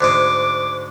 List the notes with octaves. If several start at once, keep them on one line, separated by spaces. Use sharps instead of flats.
D2 G#2 G#3 D6